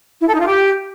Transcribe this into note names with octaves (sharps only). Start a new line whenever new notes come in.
E4
A4
D#4
F4
G4